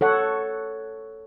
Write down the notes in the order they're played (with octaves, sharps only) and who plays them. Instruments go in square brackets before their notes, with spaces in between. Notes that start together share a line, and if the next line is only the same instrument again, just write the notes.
[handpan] A4 C#5 F#5